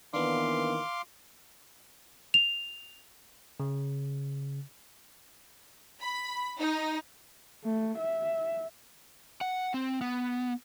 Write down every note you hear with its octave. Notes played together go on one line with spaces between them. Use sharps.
D#3 E3 A#3 B3 D4 F5 C6 D6
F7
C#3
B5
D#4
A3
E5
F#5
C4
B3